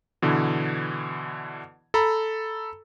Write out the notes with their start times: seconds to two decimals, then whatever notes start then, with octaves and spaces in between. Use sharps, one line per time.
0.22 B2 D3 E3
1.94 A4 A#5 B5